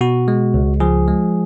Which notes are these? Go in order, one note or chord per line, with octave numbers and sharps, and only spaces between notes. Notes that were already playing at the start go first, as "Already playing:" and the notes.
B2 F#4
G#3
C#2
F3 G#4
G#3